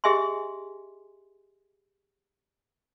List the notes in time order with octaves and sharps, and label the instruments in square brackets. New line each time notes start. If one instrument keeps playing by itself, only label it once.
[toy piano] G4 G#4 D#5 E5 G#5 C6